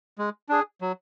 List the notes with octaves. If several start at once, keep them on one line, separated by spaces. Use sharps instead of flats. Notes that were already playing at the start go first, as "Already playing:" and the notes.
G#3
D4 G#4
F#3